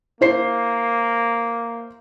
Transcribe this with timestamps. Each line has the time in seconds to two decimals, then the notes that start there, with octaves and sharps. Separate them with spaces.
0.21 A#3 E4 C5 C7